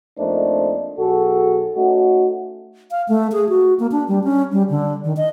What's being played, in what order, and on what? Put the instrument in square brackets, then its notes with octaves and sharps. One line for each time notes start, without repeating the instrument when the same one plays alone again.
[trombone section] F2 A3 A#3 D4 D#4 C5
B1 F#4 G#4 A4
A3 C#4 D#4 F#4
[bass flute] F5
A3
G#4
F#4
A#3
D4
G3
C#4
G3
D3
D#3
D#5